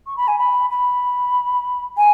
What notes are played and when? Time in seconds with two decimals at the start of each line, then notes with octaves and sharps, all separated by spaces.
0.07 C#6
0.17 B5
0.28 G#5
0.38 B5
0.70 B5
1.97 G#5